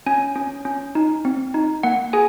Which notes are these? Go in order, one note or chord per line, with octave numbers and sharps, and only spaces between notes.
C#4 G#5
C#4
C#4
D#4
C4
D#4
A#3 F#5
G#4 G#5